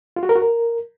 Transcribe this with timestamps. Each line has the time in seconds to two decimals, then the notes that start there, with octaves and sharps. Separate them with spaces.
0.16 F4
0.23 F#4
0.29 A#4
0.36 F#4
0.42 A#4